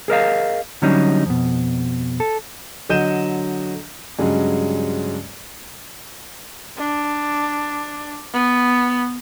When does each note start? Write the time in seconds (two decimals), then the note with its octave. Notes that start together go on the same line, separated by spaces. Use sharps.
0.08 G#4 A#4 D#5 F5
0.82 D3 F#3 G3 C#4 D#4
1.26 F2 B2
2.20 A4
2.89 D3 F#3 D#5 G6 D#7 E7
4.19 G2 C#3 F#3 G#3
6.78 D4
8.34 B3